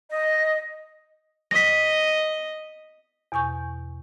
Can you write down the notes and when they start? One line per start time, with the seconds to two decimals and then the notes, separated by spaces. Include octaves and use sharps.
0.10 D#5
1.51 D#5 A#6 B6
3.32 E2 B2 G#5 C#6 G6